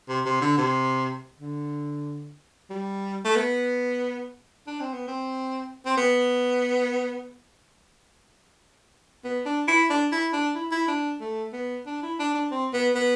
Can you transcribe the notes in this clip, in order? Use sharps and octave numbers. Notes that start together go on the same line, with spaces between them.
C3
C3
D3
C3
D3
G3
A3
B3
D4
C4
B3
C4
C4
B3
B3
D4
E4
D4
E4
D4
E4
E4
D4
A3
B3
D4
E4
D4
D4
C4
B3
B3